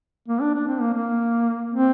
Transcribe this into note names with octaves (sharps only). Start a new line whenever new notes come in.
A#3
D4
D4
C4
A#3
A#3
C4